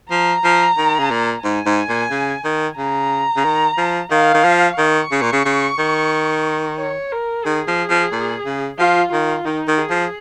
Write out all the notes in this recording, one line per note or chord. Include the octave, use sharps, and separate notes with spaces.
F3 A#5
F3
D#3
C#3
A#2
G#2 G#5
G#2
A#2
C#3
D#3
C#3 A#5
C#3
D#3
F3
D#3 F5
D#3
F3
D#3 C#6
C#3
A#2
C#3
C#3
D#3
C#5
A#4
D#3 G#4
F3
F3
A#2
C#3
F3 F4
D#3 F4
D#3 D#4
D#3
G#4
F3